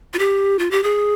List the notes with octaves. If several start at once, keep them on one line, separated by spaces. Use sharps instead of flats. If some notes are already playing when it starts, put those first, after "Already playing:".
F4
G4
F4
G4
G#4